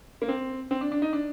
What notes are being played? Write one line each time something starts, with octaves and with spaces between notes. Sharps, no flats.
A#3
C4
C4
D4
D4
D#4
D4